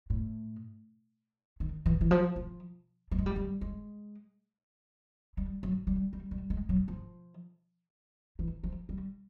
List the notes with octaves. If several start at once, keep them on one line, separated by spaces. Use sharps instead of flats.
A2
D#3
E3
E3
F3
F3
G3
G#3
G3
G3
G#3
G3
F#3
G3
G3
G3
G#3
F#3
F3
E3
F3
G3